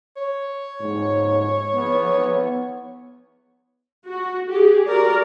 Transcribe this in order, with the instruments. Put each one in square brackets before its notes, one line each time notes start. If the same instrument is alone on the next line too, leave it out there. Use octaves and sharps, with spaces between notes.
[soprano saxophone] C#5
[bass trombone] G#2
B3
[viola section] F#4
G4 G#4
F#4 A#4 D5